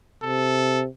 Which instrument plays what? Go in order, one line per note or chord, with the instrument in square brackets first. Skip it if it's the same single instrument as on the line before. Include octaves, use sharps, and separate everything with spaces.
[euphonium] C3 [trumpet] A4